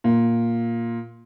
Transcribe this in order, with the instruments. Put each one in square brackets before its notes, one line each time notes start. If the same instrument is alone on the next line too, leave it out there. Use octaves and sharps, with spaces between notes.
[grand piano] A#2